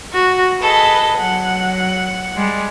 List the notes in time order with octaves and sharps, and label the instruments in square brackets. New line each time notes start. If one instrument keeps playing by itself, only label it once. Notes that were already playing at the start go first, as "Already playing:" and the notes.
[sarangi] F#4
[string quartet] G#4 A4 D#5 [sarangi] B4
[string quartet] F#3 [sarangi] F#5
[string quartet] G3 G#3